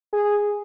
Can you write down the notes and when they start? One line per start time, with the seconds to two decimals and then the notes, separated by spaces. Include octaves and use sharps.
0.13 G#4